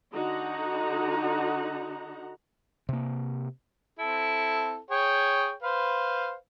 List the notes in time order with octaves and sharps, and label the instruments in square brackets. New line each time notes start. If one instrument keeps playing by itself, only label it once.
[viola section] D3 D#4 F#4 F#5 A#5
[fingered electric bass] C3 A#3
[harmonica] C4 E4 A4
G#4 C#5 G5
B4 C5 F5